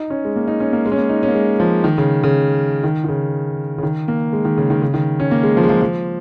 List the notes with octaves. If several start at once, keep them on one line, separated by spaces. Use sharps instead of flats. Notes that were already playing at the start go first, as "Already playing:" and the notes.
Already playing: D#4
C#4
G#3
A#3
D#4
C#4
A#3
G#3
C#4
A#3
D#4
C#4
A#3
G#3
F3
D#3
C#3
C#3
D#3
D#3
C#3
C#3
D#3
A#3
G#3
D#3
C#3
D#3
C#3
D#3
C#4
A#3
G#3
F3
G#3
F3
F3